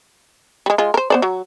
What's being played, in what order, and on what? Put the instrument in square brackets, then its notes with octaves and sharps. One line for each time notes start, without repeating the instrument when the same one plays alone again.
[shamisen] G3 G#3
G#3 F4
A#4 C5
B3 C5 D5
F#3